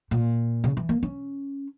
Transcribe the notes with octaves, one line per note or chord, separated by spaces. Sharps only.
A#2
C#3
E3
A#3
C#4